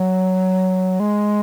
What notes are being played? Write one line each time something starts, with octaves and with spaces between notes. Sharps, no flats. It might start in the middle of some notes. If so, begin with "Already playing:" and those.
Already playing: F#3
G#3